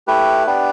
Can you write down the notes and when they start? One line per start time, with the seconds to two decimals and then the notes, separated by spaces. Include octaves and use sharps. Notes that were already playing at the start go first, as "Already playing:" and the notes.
0.07 A3 E4 G4 B4
0.47 B3 D4 G4